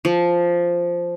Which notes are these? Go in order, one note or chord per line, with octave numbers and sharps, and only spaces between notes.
F3